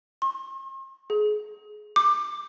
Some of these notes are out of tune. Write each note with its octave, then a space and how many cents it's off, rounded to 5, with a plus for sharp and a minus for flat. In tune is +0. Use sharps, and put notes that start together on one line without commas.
C6 +45
G#4 +25
D6 +20